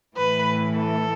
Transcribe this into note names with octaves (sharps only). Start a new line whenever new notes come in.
A2 E3 B4
A4